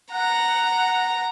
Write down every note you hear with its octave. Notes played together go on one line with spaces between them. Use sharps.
F#5 A#5